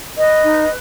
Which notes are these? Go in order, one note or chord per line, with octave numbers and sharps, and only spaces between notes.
B4 D#5
D#4